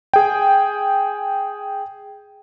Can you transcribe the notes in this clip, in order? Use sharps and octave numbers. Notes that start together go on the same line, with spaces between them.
G#4 G5